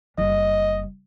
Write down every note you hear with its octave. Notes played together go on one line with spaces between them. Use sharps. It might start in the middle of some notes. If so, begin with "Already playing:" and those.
F#1 G3 D#5